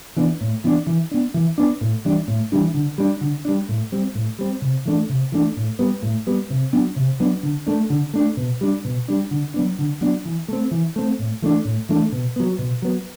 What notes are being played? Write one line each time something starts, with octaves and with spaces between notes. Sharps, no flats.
E3 B3 D4
A2
E3 B3 D4
E3
B3 D4
E3
B3 D4
A2
E3 G3 D4
A2
E3 G3 D4
D3
G3 D4
D3
G3 D4
A2
G3 C4
A2
G3 C4
C3
E3 A3 D4
C3
E3 A3 D4
A2
G3 B3
A2
G3 B3
C3
F#3 B3 D4
C3
F#3 B3 D4
D3
A3 D4
D3
A3 D4
B2
G3 D4
B2
G3 D4
D3
F#3 B3 D4
D3
F#3 B3 D4
E3
A3 C4
E3
A3 C4
A2
E3 A3 D4
A2
E3 A3 D4
B2
F#3 B3
B2
F#3 B3